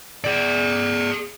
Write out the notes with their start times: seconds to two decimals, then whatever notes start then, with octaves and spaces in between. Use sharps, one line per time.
0.24 G#4 D5